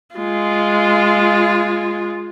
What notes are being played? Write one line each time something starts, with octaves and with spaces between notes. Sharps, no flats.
G#3 F4